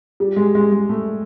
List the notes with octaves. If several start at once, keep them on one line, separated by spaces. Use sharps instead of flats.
G3
G#3
G#3
G#3
A3